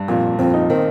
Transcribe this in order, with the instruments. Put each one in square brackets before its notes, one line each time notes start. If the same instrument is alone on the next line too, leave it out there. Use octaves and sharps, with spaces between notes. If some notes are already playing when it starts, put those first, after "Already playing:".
Already playing: [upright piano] G2
[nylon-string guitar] F2 [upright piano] A#2
[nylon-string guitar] F2 [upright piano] C4
[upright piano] D#4
[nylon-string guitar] D#3 [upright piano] C4